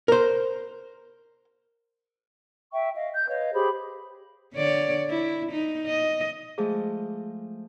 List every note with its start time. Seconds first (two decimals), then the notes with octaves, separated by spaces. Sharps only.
0.08 A#4 C5
2.72 E5 G5 C#6
2.95 D#5 F5
3.14 G6
3.28 B4 C#5 D#5 F5
3.53 G4 G#4 C5 B5
4.54 D3 C#5 D5
5.10 E4
5.52 D#4
5.86 D#5
6.58 F3 G#3 A3 G#4